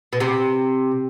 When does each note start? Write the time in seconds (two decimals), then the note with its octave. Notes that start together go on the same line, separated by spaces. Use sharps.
0.13 B2
0.20 C3